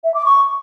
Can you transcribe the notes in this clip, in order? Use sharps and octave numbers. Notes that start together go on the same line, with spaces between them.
E5
D6
C#6